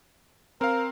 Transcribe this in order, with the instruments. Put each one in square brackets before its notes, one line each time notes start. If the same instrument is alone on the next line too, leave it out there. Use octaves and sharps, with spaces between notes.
[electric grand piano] C4 F5 [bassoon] A#4